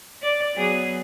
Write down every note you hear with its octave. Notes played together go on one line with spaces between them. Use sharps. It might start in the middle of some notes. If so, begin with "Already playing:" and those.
D5
F#3 B3 G#4